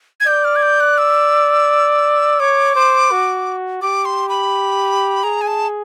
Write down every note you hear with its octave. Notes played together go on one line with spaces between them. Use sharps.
G#6
D5 G6
F6
G#6
G6
F#6
E6
C#5 D6
C5
F#4
G4 D6
C6
B5
G#4 A#5
G#5
A5